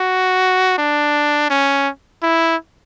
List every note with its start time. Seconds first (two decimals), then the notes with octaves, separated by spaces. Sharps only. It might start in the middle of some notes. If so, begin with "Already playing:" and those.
Already playing: F#4
0.78 D4
1.50 C#4
2.23 E4